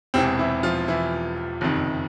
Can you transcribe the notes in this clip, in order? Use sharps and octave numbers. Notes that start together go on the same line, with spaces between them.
E1 E2 C3 E3 C4
E3 E4
F3 F4
E3 E4
F#1 F2 C3 D#3